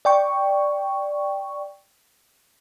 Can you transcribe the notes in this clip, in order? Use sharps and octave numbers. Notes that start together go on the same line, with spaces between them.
D5 G5 C#6